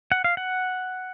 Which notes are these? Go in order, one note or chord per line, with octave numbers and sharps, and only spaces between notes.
F#5
F5
F#5